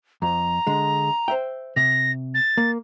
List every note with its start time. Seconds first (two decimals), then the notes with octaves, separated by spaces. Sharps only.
0.22 F2 A#5
0.67 D3 G#3
1.28 C5 E5 G5
1.76 C3 A#6
2.34 A6
2.57 A#3